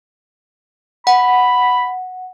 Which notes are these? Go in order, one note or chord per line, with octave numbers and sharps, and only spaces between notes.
F#5 B5